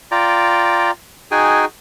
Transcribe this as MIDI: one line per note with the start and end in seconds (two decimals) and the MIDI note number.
0.11 0.91 65
0.11 0.91 74
0.11 0.91 79
0.11 0.91 82
1.31 1.65 63
1.31 1.65 66
1.31 1.65 68
1.31 1.65 79
1.31 1.65 80